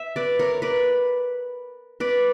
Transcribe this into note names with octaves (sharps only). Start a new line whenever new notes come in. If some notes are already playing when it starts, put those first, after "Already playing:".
Already playing: E5
B4 D5
A#4 C#5
B4 D5
B4 D5